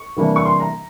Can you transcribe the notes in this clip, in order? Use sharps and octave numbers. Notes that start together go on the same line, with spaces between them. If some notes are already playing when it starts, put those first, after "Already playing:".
Already playing: C#6
C3 E3 G3 A#3 D4
C#6
C6
A#5